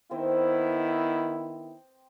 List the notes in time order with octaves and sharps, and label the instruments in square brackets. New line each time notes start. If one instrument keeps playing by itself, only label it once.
[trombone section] D#3 B3 E4 [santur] C4 D#5